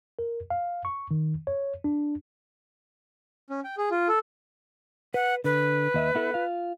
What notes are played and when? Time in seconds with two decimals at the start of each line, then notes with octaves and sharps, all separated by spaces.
0.19 A#4
0.50 F5
0.85 C#6
1.11 D#3
1.47 C#5
1.84 D4
3.50 C#4
3.64 G5
3.78 G#4
3.91 F4
4.08 A4
5.14 B4 F#5
5.44 D3 B4
5.94 D#2 D#5 E5
6.15 B3 E4 A4
6.34 F4 F5